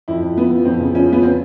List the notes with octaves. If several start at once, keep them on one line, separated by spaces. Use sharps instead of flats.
F2 E4
F2
F3 B3
F3
F2 C4
C#3
F3 C#4
F3 B3
F3 C4